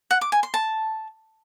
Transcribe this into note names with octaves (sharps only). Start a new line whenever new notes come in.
F#5
D6
G#5
C6
A5